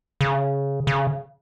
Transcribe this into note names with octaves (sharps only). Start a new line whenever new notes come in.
C#3
C#3